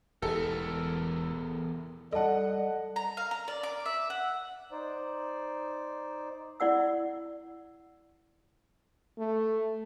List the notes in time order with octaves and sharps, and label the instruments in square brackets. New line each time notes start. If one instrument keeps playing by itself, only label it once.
[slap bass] E1 E3 [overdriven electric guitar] E2 A#4 [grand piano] A4
[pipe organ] G3 [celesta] A4 A5 [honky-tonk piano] D#5 F#5
[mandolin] A#5
F5
A#5
D5
D6
E5
F#5
[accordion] D#4 C5 D5
[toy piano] E4 D5 F#5 E6
[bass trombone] A3